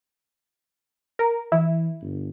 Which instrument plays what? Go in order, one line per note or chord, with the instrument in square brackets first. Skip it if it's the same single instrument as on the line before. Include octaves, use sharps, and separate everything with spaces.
[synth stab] A#4
[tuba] E3 [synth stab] E4
[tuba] G1